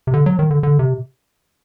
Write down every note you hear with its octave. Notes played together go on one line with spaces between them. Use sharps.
C3
D3
F#3
D#3
D3
D3
C3